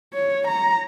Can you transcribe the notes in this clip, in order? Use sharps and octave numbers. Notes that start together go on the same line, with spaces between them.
C#5
A#5